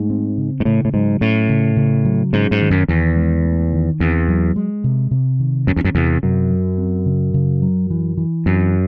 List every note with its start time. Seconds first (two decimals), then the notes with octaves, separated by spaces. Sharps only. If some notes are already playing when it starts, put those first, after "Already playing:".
Already playing: G#2 A3
0.10 C4
0.38 C#3
0.60 G#2
0.65 A2 C#3
0.85 A2
0.93 G#2 F#3
1.21 A2 C#4
1.49 C#3
1.77 C#3
2.05 F#3
2.33 G#2 C#4
2.51 G#2
2.61 D#3
2.71 F#2
2.88 E2 D#3
3.16 G#3
3.45 A3
3.73 D#3
4.00 E2 C4
4.28 F#3
4.56 G#3
4.84 C3
5.11 C3
5.40 D#3
5.67 F#2 C#4
5.76 E2
5.85 F#2
5.95 E2 C3
6.23 F#2 C3
6.51 F#3
6.78 C4
7.06 C#3
7.34 C#3
7.62 F#3
7.90 E3
8.18 E3
8.46 F#2 C4